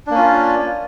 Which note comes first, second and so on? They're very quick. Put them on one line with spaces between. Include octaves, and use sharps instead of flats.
D4 A#3 C#4 F4